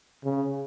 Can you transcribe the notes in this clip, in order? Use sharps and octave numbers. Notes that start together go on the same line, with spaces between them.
C#3